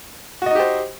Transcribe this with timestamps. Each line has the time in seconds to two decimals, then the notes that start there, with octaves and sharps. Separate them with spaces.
0.42 F#4
0.46 D#5
0.51 D#4
0.55 G4
0.60 C5